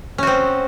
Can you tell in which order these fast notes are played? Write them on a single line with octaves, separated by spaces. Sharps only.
C#4 F#4 C4